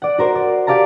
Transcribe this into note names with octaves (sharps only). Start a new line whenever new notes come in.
D5 F#5
F#4 A#4 C5
D5
G4 D5 F5 A5 A#5